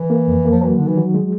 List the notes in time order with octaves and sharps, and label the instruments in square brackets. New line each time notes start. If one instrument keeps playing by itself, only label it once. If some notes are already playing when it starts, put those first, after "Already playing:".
Already playing: [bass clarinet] E3
[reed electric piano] A#3
F2
A#3
[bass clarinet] F3
[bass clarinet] E3 [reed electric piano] F#3
[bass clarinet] D3 [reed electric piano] D#3
[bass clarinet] E3
[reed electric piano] F#3
G#3